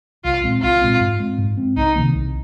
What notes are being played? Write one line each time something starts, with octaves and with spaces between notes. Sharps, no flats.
C2 F4
A#2 G#3 C4
C2 F4
A#2 G#3 C4
G#2
G#3 C4
G#2
G#3 C4
C2 D#4
C3 D#3 A#3
C2